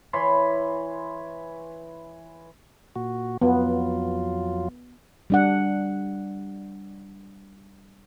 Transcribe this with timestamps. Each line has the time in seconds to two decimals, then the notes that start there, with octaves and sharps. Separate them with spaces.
0.13 E3 C#5 B5 C6
2.96 A#2 F#4
3.42 F2 F#3 B3 F4
5.30 G3 D4 F#5